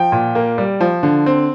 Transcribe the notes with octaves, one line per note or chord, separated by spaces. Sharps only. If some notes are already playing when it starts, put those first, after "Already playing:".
Already playing: F3 G5
A#2
A#3
G3
F3
D3
C4